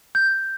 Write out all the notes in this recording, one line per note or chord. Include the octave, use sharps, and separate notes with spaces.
G6